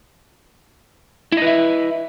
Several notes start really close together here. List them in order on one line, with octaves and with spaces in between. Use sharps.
E4 D#5 B4 E5